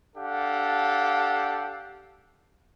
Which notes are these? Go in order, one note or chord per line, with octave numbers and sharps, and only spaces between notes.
D4 G4 A4 F5 F#5